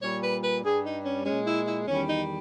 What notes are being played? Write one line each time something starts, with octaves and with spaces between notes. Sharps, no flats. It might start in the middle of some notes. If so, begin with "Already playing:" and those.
A#2 G3 C#5
B4
B4
G2 G3 G#4
D#4
C#4
A#2 G#3 C#4
E4
E4
E2 D#3 G3 C#4
D#4